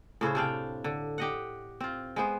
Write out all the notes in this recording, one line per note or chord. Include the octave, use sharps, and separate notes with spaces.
A2 C#3 E4 C5
C3 D4 F5 G5
D3
G4 D#5 F#5
C4 F4
G#3 B3 C5